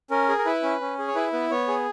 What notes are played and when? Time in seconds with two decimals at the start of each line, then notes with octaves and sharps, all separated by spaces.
0.11 C#4 A#4
0.29 G#4
0.38 A#4
0.45 E4 B4
0.63 C#4
0.81 C#4
0.99 G#4
1.08 C#5
1.15 E4 B4
1.33 B3 B4
1.51 B3 C#5
1.68 G#4